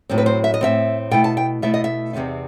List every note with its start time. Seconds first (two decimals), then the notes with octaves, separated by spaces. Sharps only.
0.10 A2 F#3 C4
0.18 B4
0.26 C5
0.44 E5
0.54 D#5
0.61 A2 F#3 C4 E5
1.11 B2 A3 E4 G5
1.24 A5
1.37 G5
1.62 B2 A3 E4 E5
1.74 D#5
1.84 E5
2.13 E2 C3 F#3 C4 D#4